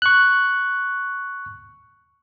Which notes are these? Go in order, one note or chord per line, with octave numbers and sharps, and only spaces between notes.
C#6 F#6